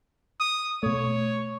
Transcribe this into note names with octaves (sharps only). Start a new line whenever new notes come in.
D#6
B2 A3 C#5